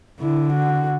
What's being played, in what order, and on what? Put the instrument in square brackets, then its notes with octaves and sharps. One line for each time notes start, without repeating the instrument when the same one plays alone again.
[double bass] D3 [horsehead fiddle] E4
[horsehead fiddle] F#4